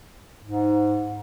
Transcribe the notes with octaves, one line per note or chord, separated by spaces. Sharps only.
G#2